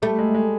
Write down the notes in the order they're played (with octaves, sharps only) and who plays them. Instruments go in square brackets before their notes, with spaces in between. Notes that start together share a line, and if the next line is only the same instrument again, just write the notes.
[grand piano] G3 [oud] A3
[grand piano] G#3
G#3